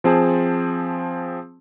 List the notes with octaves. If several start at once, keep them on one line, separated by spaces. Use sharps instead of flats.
F3 C4 G#4 A5